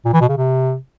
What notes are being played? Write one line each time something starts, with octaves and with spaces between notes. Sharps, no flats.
A#2
E3
B2
C#3
C3